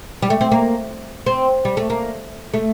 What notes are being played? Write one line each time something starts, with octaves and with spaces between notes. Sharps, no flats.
G3
A3
C4
A#3
C4
G3
A3
A#3
A3